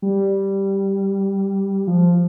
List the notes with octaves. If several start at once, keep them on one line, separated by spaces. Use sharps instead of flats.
G3
F3